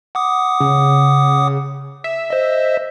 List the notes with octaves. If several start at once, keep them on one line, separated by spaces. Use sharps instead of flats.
F#5 D6 D#6
C#3
E5
C5 D#5